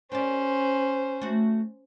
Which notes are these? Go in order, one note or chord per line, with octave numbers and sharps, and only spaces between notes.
C#4 G4 A#4 C5 D5
A3 F#4